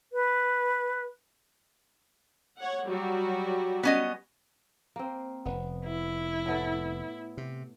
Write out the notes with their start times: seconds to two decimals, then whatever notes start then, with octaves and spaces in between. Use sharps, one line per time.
0.13 B4
2.57 C#5 F#5
2.86 F#3 G3 F#4
3.83 B3 C#4 D#5
4.96 A#3 C4
5.45 F1 B3
5.85 E4
6.46 A2 B3 A4
7.37 C3